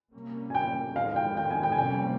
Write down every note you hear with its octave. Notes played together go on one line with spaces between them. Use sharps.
C3 G3 A#3 C#4
G#5
G5
F2 D#3 G#3 F5
F5
G5
G5
G#5
G5
G#5
F2 C3 G3 A#3 C#4 G5